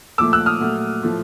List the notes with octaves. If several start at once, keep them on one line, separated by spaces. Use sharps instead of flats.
A#2 F3 A3 D6 E6
E6 F#6
D#6 F6
A#2 F#3 A3
A2 F3 A3